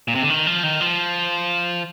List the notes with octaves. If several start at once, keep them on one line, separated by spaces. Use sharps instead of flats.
A#2
C3
D3
D#3
F3
D#3
F3